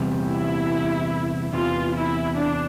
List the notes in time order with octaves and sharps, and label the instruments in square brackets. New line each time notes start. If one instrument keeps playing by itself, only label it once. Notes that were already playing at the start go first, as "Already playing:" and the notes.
Already playing: [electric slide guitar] E2 C3 G3
[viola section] E4
[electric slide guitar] E2 C3 E3 [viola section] F4
[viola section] E4
D4